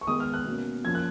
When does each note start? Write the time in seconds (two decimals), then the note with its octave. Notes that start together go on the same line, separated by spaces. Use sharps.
0.01 C#6
0.07 D#3 G#3 B3 D#6
0.20 F6
0.34 F#6
0.46 B2 A#3 C#4
0.84 F3 A#3 C#4 G#6
0.95 F#6